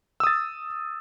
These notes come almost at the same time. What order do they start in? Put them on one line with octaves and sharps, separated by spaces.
E6 D#6 A6